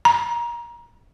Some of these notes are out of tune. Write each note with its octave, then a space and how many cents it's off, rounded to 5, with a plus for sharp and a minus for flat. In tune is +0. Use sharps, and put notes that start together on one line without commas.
A#5 +25